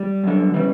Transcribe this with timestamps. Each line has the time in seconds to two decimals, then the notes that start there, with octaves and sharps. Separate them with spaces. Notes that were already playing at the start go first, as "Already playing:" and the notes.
Already playing: G3
0.24 F#2 D3
0.54 C#3 E3 G3